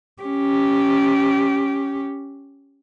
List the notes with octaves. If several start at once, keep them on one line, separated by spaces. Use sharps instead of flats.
C#4 G4